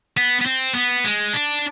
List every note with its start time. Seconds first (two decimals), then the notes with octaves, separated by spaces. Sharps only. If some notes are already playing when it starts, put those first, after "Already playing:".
0.17 B3
0.41 B3
0.46 C4
0.75 B3
1.04 G#3
1.33 D4